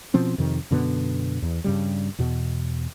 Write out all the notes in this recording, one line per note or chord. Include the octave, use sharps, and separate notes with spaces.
B2 F3 C4 C#4
F2 C3 D#3
F#2 B2 D3 B3
E2
G2 C#3 G3
E2 B2